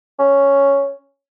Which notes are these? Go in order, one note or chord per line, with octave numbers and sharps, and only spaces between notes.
C#4